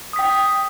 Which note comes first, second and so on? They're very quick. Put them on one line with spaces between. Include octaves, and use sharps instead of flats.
D#6 B6 G5